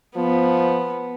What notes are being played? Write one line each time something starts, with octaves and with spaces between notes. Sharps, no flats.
F3 B3